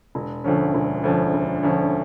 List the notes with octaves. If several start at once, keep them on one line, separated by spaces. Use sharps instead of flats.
E1
D2 D3 F3 C#4
E1
D2 D3 F3 C#4
E1
D2 D3 F3 C#4